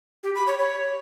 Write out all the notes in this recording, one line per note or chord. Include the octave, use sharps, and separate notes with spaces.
G4
B5
C#5
C#5